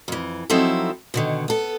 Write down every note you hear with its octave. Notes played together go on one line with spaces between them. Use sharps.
F2 E3
F3 F#3 C4 D#4 E4 A4
B2 D3 D#3
B3 A4